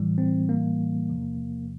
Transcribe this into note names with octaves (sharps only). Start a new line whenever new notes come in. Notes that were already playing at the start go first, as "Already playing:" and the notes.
Already playing: A2 E3 G3
C4
A#3
E2 C3 F3